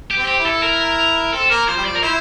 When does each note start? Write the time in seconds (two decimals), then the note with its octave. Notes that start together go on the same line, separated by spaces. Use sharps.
0.10 G4
0.16 C4
0.27 G4
0.39 E4
0.46 A4
0.62 A#4
1.33 C4 A4
1.50 A#3 A#4
1.67 F3 C5
1.77 G3
1.85 F3 D5
1.96 A#4
2.02 E4 C5